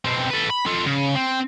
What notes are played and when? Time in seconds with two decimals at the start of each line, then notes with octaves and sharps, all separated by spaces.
0.05 B2 C4
0.30 A4 B4
0.50 B5
0.67 F4 A4
0.86 C#3
1.16 C4